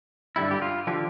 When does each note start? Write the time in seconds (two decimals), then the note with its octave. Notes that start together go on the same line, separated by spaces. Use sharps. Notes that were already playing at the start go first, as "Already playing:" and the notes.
0.36 G2 D3 G3 E4
0.51 G4
0.62 F4
0.87 D3 F3 G4